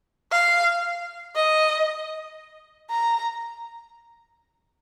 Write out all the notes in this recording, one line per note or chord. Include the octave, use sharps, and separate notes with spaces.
F5
D#5
A#5